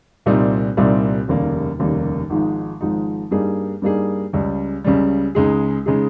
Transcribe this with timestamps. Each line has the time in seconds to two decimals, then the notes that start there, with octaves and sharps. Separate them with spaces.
0.26 C2 A#2 G3 C4 D#4
0.77 C2 A#2 G3 C4 D#4
1.28 F1 D#2 C#3 G3 A#3
1.79 F1 D#2 C#3 G3 A#3
2.30 G#1 G#2 F3 G#3 D#4
2.81 G#1 G#2 F3 G#3 D#4
3.31 G2 G3 A#3 D#4 G#4
3.82 G2 G3 A#3 D#4 G#4
4.33 C#2 C#3 G3
4.84 C#2 C#3 G3
5.35 C#2 C#3 G#3 D#4 G#4
5.86 C#3 G#3 D#4 G#4